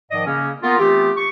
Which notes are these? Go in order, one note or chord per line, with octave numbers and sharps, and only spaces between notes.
G#2 D#3 F3 D5 D#5
C#3 A#3 C#4
A#3 B3 F4 A#4
E3 A3 B3 C4 F4 G4
C#6